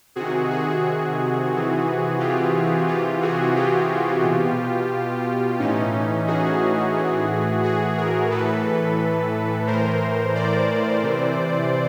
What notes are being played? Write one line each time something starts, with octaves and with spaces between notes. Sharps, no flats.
C3 D#3 F#4 G#4
F#4 G#4
C3 E3
F4 G4
C3 E3 F4 G4
F#4 G#4
F4 G4
B2
A2 E3 C#4 D#4
F#4 G#4
A2 E3
F#4 G#4
G#4 A#4
A2 E3 A4 B4
A2 E3 A#4 C5
C5 D5
C3 E3